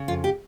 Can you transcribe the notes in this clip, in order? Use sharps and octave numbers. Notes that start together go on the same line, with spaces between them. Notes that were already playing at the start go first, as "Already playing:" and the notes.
Already playing: C#3
F2 F4
G4